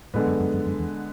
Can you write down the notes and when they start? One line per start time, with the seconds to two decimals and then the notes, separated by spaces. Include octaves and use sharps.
0.14 A2 D3 G#3 B3
0.27 F#2
0.39 F#2
0.53 F#2
0.66 F#2
0.79 E2